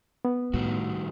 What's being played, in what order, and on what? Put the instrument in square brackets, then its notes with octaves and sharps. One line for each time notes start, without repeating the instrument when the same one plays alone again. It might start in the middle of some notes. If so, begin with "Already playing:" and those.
[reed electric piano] B3
[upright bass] A2 [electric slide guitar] D#3 G3 F#4